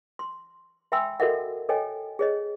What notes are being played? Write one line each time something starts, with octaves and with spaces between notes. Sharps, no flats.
C6
E5 G5 G#5 B5 C6 E6
F#4 A4 A#4 D#5 E5 F#5
A4 C#5 D#5 G5 G#5
G#4 C#5 D#5